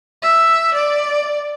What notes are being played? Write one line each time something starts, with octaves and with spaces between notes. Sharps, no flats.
E5
D5